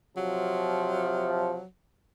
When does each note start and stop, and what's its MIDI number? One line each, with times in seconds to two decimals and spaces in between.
0.17 1.58 48
0.17 1.58 53
0.17 1.65 54